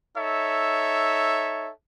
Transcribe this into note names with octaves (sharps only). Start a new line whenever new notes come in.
D#4 A4 C#5 E5